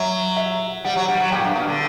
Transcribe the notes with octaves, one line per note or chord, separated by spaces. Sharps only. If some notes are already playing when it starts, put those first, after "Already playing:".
Already playing: F#3 E5
E5
G3 F#5
F#3
G3 F#5
F#3
A#2 G5
G2
B2
D3